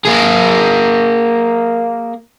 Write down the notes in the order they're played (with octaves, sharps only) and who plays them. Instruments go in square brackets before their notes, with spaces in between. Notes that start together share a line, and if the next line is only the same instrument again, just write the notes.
[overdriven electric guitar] A#3 G#4